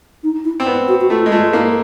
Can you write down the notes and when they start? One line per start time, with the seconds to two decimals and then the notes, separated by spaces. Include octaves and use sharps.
0.23 D#4
0.45 E4
0.60 C4
0.66 B3
0.88 F#4
1.01 F#4
1.10 A3 F4
1.26 G#3
1.32 A3 F4
1.53 A#3 E4